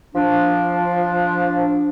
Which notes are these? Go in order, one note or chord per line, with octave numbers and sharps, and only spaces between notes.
F3 D4